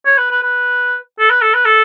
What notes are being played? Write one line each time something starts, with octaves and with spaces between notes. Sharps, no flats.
C#5
B4
B4
B4
A4
B4
A4
B4
A4